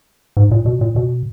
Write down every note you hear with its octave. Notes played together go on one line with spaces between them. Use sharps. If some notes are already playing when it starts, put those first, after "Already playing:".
G#2
A#2
B2
A#2
B2